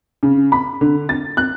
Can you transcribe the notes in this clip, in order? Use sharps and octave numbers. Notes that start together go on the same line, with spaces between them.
C#3
B5
D3
A6
F#6